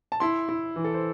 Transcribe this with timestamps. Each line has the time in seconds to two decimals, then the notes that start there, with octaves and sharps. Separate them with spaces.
0.12 A5
0.20 E4 C6
0.49 E4
0.76 E3
0.84 A4
0.94 C5